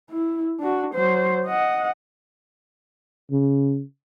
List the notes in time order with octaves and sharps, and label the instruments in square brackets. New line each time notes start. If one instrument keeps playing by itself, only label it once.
[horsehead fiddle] E4
D4 F#4
F#3 C5
D#5 F#5
[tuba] C#3